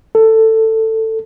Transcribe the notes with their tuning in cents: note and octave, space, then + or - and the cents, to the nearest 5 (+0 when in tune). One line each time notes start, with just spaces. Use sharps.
A4 +15